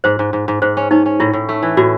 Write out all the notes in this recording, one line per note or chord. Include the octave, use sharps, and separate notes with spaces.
G#2 C5
G#2
G#2
G#2
G#2 C5
C#4
C#4 D#4
C#4
A2 E4
A2
A3
E3
A2 F#4